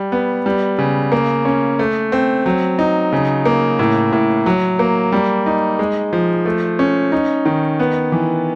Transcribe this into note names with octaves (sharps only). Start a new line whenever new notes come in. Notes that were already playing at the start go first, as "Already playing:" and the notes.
Already playing: G3
B3
G3
C#3
A#3
C#4
A3
C4
F#3
D#4
C#3
A#3
A2
A2
F#3
A#3
G3
D#4
G#3
F3
A3
C#4
D#4
D#3
B3
E3